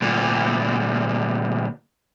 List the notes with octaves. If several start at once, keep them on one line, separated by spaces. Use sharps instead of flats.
D2 A#2